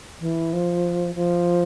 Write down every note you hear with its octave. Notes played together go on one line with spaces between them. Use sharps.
E3
F3
F3